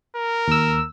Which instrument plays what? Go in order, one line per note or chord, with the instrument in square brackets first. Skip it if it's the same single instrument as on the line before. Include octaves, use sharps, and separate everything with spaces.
[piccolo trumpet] A#4
[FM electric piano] D#2 E6